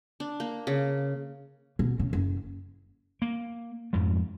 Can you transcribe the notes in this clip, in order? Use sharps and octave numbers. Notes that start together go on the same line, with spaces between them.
D4
A#3
C#3
B2
C#3
F#1
A#3
F2 G#2 F3